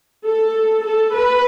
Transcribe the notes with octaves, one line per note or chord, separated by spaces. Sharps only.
A4
A4
B4